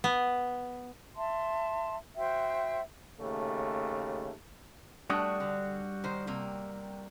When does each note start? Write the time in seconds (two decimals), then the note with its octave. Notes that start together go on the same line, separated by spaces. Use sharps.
0.04 B3
1.15 E5 A5 C6
2.16 F#4 C5 E5 G5
3.20 D#2 C#3 A3
5.10 G3 A3 D4 F#4 D#6
5.40 D3
6.04 D#3 C5
6.27 C3 A#3